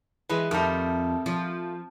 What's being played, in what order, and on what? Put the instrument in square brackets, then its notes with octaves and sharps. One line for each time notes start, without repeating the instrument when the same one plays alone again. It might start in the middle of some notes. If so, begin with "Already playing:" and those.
[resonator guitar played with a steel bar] E3 G#3 [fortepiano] B4
[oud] F2 [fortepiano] D#3 G3 [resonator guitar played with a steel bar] A3 A#5
[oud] F3